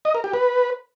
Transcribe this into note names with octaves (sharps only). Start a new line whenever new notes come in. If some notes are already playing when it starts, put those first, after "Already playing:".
D#5
A#4
G4
B4